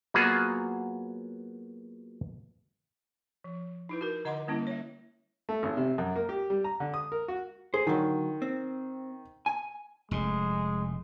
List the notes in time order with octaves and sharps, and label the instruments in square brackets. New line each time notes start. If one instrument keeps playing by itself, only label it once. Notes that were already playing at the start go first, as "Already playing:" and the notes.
[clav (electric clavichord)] F#3 A#3 B3 F4 F#4 G#4
[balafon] F3
D#4 E4 B4
F#4 A#4
D3 D#5 F#5 A#5 C6 D6
D3 G3 A#3 C#4 E4
C#5 E5
[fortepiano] A3
G#1
C3
F#2
A#3
G4
G3
A#5
D3
D#6
A#4
F#4
[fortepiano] G#4 [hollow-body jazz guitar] C5
[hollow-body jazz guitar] D3 F#3 [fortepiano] D#3
[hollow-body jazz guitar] C4
G#5
[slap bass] F1 A2 [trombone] G#3